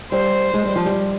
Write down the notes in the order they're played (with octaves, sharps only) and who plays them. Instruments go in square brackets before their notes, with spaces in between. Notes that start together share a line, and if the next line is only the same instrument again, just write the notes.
[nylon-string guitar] G3 [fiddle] C5
[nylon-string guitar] G#3
G3
F3
G3